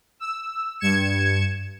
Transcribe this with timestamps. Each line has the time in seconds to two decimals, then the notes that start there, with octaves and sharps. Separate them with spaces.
0.20 E6
0.79 G2 G#6 C#7 E7